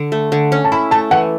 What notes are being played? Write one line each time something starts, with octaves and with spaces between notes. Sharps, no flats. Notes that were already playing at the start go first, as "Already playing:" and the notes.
Already playing: D3
A3
D3
C#4
A5
E4 B5
A3 A5
E3 F#5